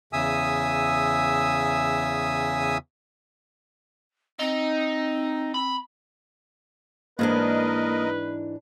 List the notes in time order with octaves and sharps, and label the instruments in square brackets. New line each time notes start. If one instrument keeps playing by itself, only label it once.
[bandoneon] E2 C#3 E5 G#5 D#6 E6
[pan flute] C4 [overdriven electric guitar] D#4
[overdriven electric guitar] B5
[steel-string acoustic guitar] G#2 E3 D4 [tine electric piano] A#3 [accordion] A#4 D#5 [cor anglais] B4